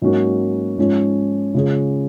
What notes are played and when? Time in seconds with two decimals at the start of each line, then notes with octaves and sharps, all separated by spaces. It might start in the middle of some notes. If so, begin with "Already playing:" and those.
0.02 G#2 F#3 A#3 C#4 F#4
0.77 G#2 F3 G#3 C#4
1.54 C#3 G#3 C#4 F4 G#4